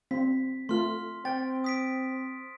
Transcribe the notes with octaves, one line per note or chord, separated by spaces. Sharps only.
C4 B6
A3 F4 C6 F6
C4 G5 A6
D#6 B6 D7